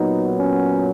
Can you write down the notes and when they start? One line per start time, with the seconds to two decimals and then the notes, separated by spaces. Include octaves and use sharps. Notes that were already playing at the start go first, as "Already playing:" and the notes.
Already playing: A#2 F#3 B3 D#4
0.38 C#4